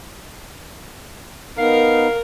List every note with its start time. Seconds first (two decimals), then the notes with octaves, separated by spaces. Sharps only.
1.58 B3 D#4 A#4 F5